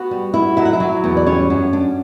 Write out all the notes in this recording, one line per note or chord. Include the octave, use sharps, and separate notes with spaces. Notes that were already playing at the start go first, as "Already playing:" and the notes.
Already playing: B3 F#4 F#5
G3
E4
F#3 E5
F#5
E4 E5
F#3
E2
D5
G3 C#4 C#5
F#2
D4